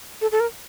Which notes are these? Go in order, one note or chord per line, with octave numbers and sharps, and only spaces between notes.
A4
A4
A#4